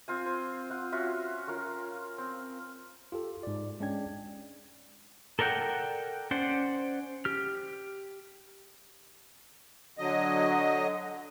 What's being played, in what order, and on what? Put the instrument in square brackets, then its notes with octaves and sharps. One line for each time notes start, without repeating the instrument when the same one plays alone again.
[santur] C4 F4 G#5
C5
F4 F#5
C#4 F4 F#4 E5
C#4 F4 A#4 C#6
C4
[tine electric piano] F4 G4 A4
G#2 D5
G#3 C#4 D4 D5 G5 G#6
[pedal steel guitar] A4 A#4 D5 F#5 G5
C#4 C5 D5 F#5
G4 F6
[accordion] D3 F#3 D#5